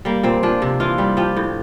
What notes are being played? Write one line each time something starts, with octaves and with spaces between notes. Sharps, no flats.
G3 A#3
A#2 C4
F3 D4
C3
E3 F4
G3
F3 G4
A2